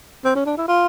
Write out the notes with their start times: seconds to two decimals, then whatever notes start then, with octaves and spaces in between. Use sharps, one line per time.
0.25 C4
0.36 C#4
0.46 D4
0.58 E4
0.68 F4